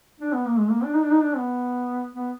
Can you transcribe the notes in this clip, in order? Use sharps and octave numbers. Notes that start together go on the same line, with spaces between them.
D4
B3
A#3
G#3
A#3
D4
D#4
D4
D#4
D4
B3
B3